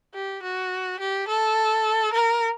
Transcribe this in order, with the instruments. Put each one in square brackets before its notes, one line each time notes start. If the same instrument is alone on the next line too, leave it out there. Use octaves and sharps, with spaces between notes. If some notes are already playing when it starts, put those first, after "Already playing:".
[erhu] G4
F#4
G4
A4
A#4